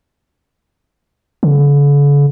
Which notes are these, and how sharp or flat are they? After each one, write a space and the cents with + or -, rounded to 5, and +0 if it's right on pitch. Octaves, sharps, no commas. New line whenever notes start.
D3 -45